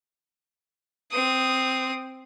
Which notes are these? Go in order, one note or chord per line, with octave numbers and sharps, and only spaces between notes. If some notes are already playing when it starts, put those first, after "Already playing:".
C4 D#6